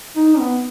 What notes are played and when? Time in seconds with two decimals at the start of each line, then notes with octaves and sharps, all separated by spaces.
0.16 D#4
0.39 B3